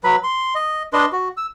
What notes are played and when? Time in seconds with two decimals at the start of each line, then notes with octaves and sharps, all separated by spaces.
0.04 F#3 B4 B5
0.24 C6
0.55 D#5
0.93 D4 B4 D#5 C6
1.12 F#4
1.37 E6